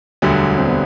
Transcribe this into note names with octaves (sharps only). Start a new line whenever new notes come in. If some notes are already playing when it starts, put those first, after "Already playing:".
E1 D2 D3 F#3 G3
C4
B3